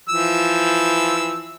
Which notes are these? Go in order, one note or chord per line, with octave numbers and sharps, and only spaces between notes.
E3 F3 E6